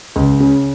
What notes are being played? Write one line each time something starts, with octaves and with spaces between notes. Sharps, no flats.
C#2
C#3